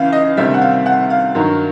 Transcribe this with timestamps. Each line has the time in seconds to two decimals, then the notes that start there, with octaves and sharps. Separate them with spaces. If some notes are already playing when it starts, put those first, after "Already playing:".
Already playing: C#2 C#3 E3 F5
0.12 D#5
0.37 D2 C3 D#3 G3 C4 E5
0.54 F#5
0.62 F5
0.86 F#5
1.10 F5
1.35 G2 D#3 F#3